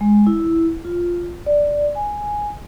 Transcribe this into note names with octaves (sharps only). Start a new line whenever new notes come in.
G#3
E4
F4
D5
G#5